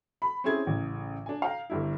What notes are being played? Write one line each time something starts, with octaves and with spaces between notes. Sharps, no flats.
B5
C4 C#4 E4 G#4 G#6
A1 C#3
D4 G#5
F5 G5 A#5
G1 G2 E4